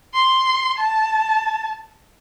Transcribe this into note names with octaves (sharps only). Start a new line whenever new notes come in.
C6
A5